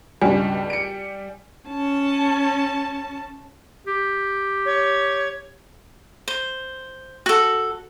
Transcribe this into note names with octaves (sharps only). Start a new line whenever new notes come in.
C#2 G2 B2 G3 G#5
C#7 D7
C#4 A5
G4
C#5
C5
F#4 A4